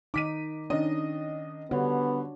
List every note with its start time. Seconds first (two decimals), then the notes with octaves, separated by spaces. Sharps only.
0.14 D#3 D#4 D6 B6 D#7
0.70 D#3 C#4 D4 D#5
1.71 D3 G3 B3 D4 F#4 C#5